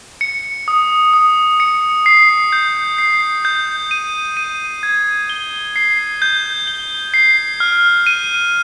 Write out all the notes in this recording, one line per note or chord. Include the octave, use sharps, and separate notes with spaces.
C#7
D#6
D#6
C#7
C7
G6
C7
G6
D#7
D#7
G#6
G7
C7
G6
G7
C7
F6
D#7